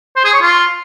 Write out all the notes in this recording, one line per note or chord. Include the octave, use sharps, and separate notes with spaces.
C5
G#4
C#5
F4